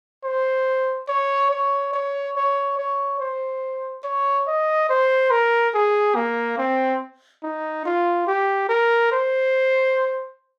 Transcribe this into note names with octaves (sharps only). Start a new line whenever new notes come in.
C5
C#5
C#5
C#5
C#5
C#5
C5
C#5
D#5
C5
A#4
G#4
A#3
C4
D#4
F4
G4
A#4
C5